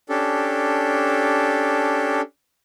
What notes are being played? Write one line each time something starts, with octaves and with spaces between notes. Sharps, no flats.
C#4 D4 G4 A4